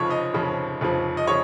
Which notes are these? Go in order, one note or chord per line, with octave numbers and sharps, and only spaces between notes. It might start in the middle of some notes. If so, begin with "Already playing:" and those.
Already playing: F1 F2 C#3 F3 C#5
D#5
F1 F2 C#3 F3
F1 F2 C#3 F3
D#5
C#3 F3 C#5